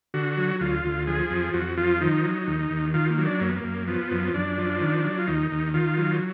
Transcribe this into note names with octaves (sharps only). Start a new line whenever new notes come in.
D3 F#4
F#3
D2 F4
D2
F3 G#4
F2
F2 F#4
F3 F4
D#3 D#4
F#3
D#2
D#2
D#3 F4
A#3
F#3
D4
F#2 A#3
B3
A#3
F#2
F3 B3
F#2
F#2 D4
F3
D#3
F#3
F4
D#2 D#4
D#2
D#3 F4
F#3